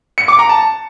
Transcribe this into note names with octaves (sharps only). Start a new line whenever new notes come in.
C#7
D6
A#5
A5